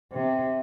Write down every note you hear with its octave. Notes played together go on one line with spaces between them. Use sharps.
C3